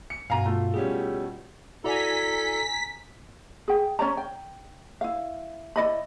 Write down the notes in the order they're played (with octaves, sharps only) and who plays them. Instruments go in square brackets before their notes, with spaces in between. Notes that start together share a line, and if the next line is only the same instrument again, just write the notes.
[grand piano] C#7
[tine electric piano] G2 B2 F#4 [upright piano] F5 G#5 A#5
[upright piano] A3 F4
[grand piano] B2 G3 C#4 [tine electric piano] G#4
[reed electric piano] E4 F#4 D5 [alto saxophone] A4 [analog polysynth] G#5 A#5 [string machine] B6
[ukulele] G#4 G5
C#4 C#5 D5 A#5
G5
E4 F5
E4 D5 D#5 B5